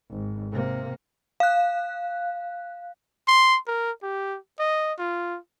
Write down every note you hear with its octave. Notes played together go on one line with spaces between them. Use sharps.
G#1
C3 A#3
F5 F#6
C6
A#4
G4
D#5
F4